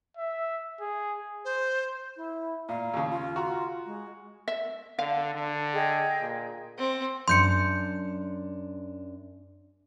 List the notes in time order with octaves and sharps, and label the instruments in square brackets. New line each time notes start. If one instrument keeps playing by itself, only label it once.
[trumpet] E5
G#4
[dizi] C5
[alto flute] E4
[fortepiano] A#2 [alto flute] F5
[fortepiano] D#2 C#3
[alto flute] F4
[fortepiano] F#4 A#5
[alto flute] G#3
[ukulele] E5
[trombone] D3 [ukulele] F5
[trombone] D3
[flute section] G#4 D#5 G5
[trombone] A#2
[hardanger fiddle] C4
[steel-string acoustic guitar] F#2 D4 [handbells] C6 G6 C#7